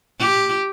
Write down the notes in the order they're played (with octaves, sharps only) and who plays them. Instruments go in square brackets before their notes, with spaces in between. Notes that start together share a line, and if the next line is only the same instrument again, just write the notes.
[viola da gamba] G4